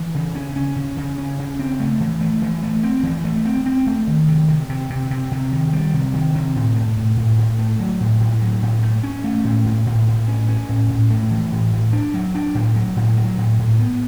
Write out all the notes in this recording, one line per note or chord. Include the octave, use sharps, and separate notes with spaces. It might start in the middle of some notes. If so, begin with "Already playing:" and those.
Already playing: E3
C#3
C#4
C#4
C#3
C#3
C#4
C#3
C4
A3
E3
A3
E3
A3
C4
E3
A3
C4
C4
A3
D#3
C3
C3
C3
C3
C3
C3
D#3
G3
C3
D#3
C3
A2
A3
A2
A2
A2
A3
F#3
A2
A2
F#3
A2
A3
C#4
A3
A2
A2
A2
A2
C#4
C#4
A2
A2
A3
E3
A2
A2
D4
F#3
D4
A2
F#3
A2
F#3
A2
A2
B3